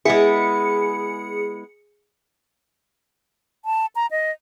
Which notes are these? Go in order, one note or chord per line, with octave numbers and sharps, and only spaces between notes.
G#3 B3 E4 G#4 C#7
A5
A#5
D#5